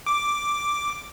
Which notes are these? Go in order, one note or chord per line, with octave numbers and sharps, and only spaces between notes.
D6